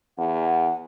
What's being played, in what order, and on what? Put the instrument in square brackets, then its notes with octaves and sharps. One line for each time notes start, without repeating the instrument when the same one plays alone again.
[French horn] E2 [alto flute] F#5